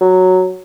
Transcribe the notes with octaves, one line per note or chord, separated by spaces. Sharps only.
F#3